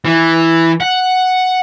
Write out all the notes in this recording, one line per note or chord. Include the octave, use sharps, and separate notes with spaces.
E3
F#5